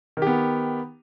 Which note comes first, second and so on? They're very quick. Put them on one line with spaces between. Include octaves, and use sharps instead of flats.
D#3 G4 B3